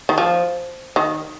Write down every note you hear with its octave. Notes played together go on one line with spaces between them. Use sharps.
D#3
F3
D#3